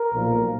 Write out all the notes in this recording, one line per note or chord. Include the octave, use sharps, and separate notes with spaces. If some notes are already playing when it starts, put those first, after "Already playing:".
Already playing: A#4
B1 A#2 F3 A#3